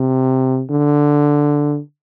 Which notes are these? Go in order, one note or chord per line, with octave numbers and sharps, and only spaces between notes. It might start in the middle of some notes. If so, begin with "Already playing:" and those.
Already playing: C3
D3